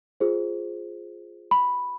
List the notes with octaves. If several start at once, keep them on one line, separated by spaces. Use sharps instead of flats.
F4 G#4 C5
B5